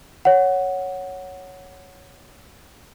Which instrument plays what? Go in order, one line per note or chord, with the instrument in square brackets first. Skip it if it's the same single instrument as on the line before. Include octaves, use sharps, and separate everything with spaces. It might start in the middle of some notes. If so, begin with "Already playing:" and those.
[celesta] C#5 F#5